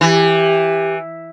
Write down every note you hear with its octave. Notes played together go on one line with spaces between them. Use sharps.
E3 G4